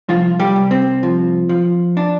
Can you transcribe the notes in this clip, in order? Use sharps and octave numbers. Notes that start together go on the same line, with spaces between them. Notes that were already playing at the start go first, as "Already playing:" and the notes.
C2 F3 F4
G3 G4
C2
C4
F3
F3
D4